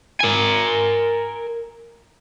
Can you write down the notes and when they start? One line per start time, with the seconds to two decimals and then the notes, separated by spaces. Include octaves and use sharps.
0.20 A#4 G#5